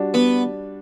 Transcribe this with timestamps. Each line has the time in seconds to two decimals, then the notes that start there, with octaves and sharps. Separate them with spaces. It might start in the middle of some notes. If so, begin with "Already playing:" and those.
Already playing: G3 D4 F#4
0.14 B3